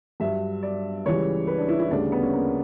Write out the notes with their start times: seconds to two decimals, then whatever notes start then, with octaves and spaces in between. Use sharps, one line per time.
0.20 G2 F#3 E5
0.63 D5
1.05 C#2 C#3 E3 G3 C#5
1.47 B4
1.58 D4
1.68 E4
1.80 E4
1.91 D2 C#3 G3 D4
2.12 B3
2.23 C#4
2.33 A#3